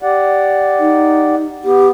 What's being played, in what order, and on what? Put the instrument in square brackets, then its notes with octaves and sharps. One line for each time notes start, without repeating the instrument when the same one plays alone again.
[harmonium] G4 D5 F#5
[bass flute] D#4
[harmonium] B3 [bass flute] G4